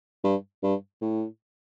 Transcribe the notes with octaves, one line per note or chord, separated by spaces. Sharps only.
G2
G2
A2